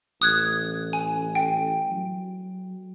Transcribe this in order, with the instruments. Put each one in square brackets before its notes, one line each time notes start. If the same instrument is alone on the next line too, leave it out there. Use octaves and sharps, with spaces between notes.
[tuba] A1 [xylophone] D#6 F#6 G#6
[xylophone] G#5
G5
[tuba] F#3